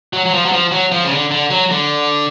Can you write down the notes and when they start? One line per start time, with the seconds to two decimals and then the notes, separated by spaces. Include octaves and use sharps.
0.13 F#3
0.26 F#3
0.33 F3
0.45 F#3
0.52 F3
0.71 F#3
0.92 F3
1.04 C#3
1.11 D3
1.31 D3
1.50 F#3
1.71 D3